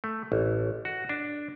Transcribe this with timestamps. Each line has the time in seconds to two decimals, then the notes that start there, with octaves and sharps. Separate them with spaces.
0.04 A3
0.32 A1
0.85 F#4
1.09 D4